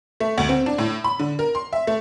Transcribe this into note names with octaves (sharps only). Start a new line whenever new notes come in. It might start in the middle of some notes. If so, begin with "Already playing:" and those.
A3
D2
C4
D4
A2
B5
D3
A#4
C6
E5
A3